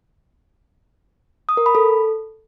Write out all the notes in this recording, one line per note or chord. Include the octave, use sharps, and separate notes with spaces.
D#6
A#4
B5
A4